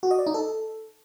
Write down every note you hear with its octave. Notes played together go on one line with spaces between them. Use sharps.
F#4
D#5
D5
D#4
A4